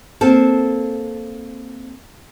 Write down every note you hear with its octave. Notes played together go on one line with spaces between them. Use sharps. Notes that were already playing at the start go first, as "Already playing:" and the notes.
A#3 C4 A4